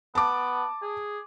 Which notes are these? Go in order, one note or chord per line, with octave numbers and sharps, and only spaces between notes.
B3 A5 D6
G#4